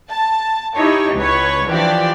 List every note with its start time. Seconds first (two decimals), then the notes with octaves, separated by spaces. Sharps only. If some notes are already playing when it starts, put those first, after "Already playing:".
0.10 A5
0.76 D#4 E4 G4 C#5
1.16 C#2 B4 C#5
1.67 E3 F3 D4 G4 D5